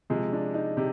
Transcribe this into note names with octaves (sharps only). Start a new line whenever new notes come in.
C3 F3 G#3
D4
D#4
C3 G4